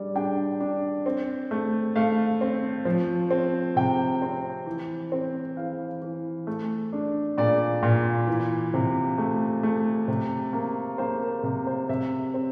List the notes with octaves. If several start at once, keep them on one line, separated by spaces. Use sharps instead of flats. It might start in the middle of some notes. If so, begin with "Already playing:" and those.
Already playing: G3 D4 D5
D4 G5
D4
C4
A3
A3 F5
C4
F3
C4
C3 G5
C4
E3
C4
E3 F5
E3
A3
D4
A#2 D5
A#2
E3
C3
A3
A3
C3
A#3
A#3 C5
A#4
C3
C5
C3 E5
C4